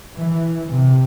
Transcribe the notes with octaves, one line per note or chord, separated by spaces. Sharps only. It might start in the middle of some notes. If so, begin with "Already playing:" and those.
E3
C3